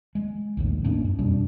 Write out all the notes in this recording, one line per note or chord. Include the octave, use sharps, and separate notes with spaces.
G#3
A#1 D#2 A2
A2 A#3 C#4 D4
F#2
F2 B2 G3 D4